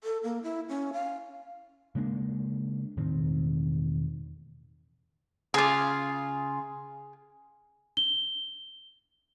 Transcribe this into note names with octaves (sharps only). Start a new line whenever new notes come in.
A4
A#3
E4
C#4
F5
C#3 G#3 A#3 D4
E1 A2 D#3 C4
C#3 F4 G#4 D6
G7